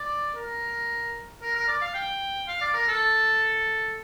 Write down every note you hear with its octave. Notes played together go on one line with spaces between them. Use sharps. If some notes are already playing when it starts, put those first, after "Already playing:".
Already playing: D5
A#4
A#4
A#4
D5
F5
G5
F5
D5
A#4
A4